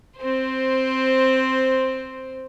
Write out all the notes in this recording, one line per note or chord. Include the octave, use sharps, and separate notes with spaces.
C4 C5